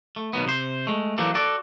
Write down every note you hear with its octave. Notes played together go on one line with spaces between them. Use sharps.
A3
B2 D#3 F#3 B3
C3 C5
G#3 A3
E3 F#3 A#3 D4 G4 A4
F#4 A4 D5